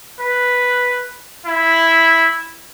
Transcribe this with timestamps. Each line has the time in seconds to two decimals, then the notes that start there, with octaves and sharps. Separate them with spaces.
0.20 B4
1.46 E4